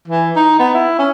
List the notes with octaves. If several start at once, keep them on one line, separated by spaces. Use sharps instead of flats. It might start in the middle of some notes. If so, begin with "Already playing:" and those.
E3
D#4
B3
E4
C#4